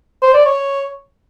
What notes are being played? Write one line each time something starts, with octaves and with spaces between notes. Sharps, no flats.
C5
D5
C#5